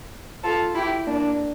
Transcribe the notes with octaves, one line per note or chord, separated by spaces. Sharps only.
F4 A4
E4 G4
A#3 D4